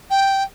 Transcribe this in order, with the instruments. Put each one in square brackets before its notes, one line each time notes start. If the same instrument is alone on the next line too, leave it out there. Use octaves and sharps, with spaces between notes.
[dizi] G5